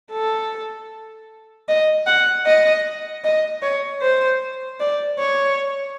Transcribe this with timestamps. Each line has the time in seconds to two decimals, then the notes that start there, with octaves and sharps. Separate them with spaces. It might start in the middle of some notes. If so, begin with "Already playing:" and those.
0.12 A4
1.69 D#5
2.07 F#5
2.46 D#5
3.24 D#5
3.62 C#5
4.02 C5
4.80 D5
5.19 C#5